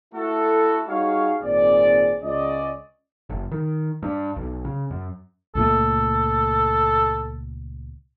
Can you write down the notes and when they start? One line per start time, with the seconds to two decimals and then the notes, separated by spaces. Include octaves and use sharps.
0.14 A3 E4 F#4 A4
0.88 G3 D#4 F#4 G#4 C#5 F5
1.42 G#1 A#2 C4 G#4 D5
2.23 C#2 C#4 D5 D#5
3.29 F#1
3.51 D#3
4.03 G2
4.36 B1
4.65 C#3
4.91 F#2
5.55 C#2 A#2 A3 A4